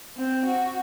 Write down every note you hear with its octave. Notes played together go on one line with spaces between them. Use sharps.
C4
F#4